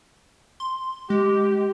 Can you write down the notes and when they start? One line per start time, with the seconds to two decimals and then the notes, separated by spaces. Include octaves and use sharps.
0.60 C6
1.10 G#3 G4